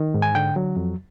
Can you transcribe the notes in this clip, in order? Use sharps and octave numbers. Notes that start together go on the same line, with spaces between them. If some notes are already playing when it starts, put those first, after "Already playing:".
Already playing: D#3
G#2
G#5
D3 G5
F#3
F2